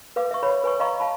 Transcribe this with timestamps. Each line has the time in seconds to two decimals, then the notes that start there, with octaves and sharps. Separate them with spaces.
0.16 B4 F5 D6
0.31 E5 C#6
0.43 B4 C#5 B5
0.64 B4 G#5 C#6
0.80 D#5 F5 A#5 B5 C#6
1.00 F5 A5 B5